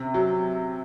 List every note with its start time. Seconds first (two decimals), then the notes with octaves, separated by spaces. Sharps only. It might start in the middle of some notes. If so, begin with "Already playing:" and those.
Already playing: C3
0.14 F#3